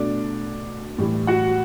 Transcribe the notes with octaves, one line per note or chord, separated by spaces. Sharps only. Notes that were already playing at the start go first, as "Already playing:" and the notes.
Already playing: B2 A3 D4 D5
A2 E3 G3
F#4 F#5